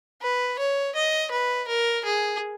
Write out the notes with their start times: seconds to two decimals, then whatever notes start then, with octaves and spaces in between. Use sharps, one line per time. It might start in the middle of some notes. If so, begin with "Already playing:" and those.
0.22 B4
0.59 C#5
0.96 D#5
1.31 B4
1.68 A#4
2.05 G#4